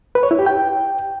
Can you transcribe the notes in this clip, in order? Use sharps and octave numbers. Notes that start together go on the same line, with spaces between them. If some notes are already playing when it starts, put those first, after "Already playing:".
B4
C#5
E4
G4
G5